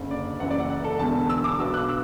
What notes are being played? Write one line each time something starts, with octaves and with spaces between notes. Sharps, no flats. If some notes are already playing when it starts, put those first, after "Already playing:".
Already playing: F#1 F#2 D3
D5
F#1 F#2 E3 F#5
D5
F#5
F#5
A4
E1 E2 D3 A5
E6
D6
B1 B2 B3 D4 F#4 E6
F#6
E6